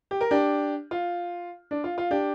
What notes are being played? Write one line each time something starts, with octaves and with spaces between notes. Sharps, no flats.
G4
A#4
D4 G4
F4
D4
F4
F4
D4 G4